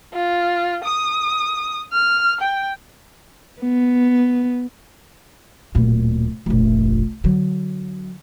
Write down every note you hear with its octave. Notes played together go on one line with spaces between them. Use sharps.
F4
D#6
F6
G5
B3
D1 A#2
F1 A#1
D3 F#3